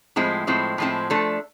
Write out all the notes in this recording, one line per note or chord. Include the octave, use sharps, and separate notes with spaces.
A2 F3 G#3 C4 E4
A2 F3 G#3 C4 E4
A2 F3 G#3 C4 E4
F3 A3 D4 A4